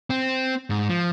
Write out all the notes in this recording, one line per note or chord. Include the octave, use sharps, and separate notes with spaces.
C4
G#2
F3